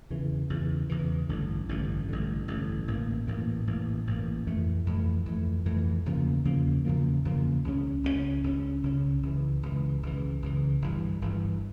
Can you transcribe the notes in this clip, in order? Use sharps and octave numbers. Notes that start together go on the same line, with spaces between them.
E2 C#3 E3
E2 C#3 E3
E2 C#3 E3
A1 G2 D3
A1 G2 D3
A1 G2 D3
A1 G2 D3
A1 A2 E3 A#3
A1 A2 E3 A#3
A1 A2 E3 A#3
A1 A2 E3 A#3
F2 E3 A3
F2 E3 A3
F2 E3 A3
F2 E3 A3
E2 C#3 F3 A#3
E2 C#3 F3 A#3
E2 C#3 F3 A#3
E2 C#3 F3 A#3
C#2 C#3 F3 C#4
C#2 C#3 F3 C#4
C#2 C#3 F3 C#4
C#2 C#3 F3 C#4
C#2 C#3 E3
C#2 C#3 E3
C#2 C#3 E3
C#2 C#3 E3
G1 G2 E3
G1 G2 E3